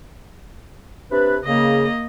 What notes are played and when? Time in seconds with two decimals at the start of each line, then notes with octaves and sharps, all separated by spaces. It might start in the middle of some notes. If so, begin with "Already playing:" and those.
1.12 C3 D4 B4
1.45 C#3 A#3 D#5